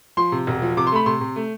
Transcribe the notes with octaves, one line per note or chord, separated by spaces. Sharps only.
F3 C6
C3
E1
F3
C3 D6
C6
A3 B5
C3 C6
C3
A3